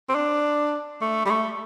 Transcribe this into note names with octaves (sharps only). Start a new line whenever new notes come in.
C4
D4
A3
G3
A3